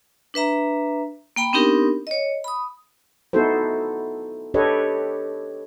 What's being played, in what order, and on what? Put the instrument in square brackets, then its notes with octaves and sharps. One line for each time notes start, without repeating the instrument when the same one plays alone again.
[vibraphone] D4 B4 E5 A#5
A#3 G5 B5
B3 C4 D4 D#4 G4 A#4
C#5 D#5
B5 D#6
[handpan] B3 D#4 E4 F#4 A4 C5
D4 G4 A4 B4 C#5 D#5